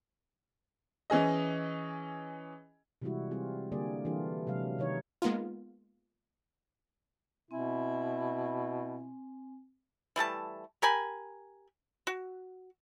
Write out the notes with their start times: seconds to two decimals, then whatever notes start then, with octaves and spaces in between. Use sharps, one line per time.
1.10 E3 C#4 G#4 D#5
3.02 C3 E3 G3 G#3 E4 F#4
3.31 G3 C4 F4 G#4
3.72 D3 G3 A#3 G#4 D5
4.05 E3 A#3 D4 F4 G4
4.47 C3 F#3 G#3 F5
4.78 C3 D#3 D#4 C#5
5.22 G#3 A#3 B3 D#4 F4
7.51 B2 C4 E4 G#5
10.16 E3 G3 A3 A5
10.82 G4 A#4 G#5 B5
12.07 F#4